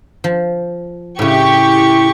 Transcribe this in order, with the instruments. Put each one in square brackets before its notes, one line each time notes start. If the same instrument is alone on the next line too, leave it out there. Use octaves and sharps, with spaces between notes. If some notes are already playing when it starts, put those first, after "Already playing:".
[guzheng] F3
[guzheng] A2 C#3 [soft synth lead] E4 [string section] G4 C#6